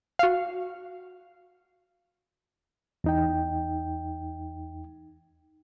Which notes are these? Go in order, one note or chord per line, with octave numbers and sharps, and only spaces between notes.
F#4 F5
E2 D#4 G5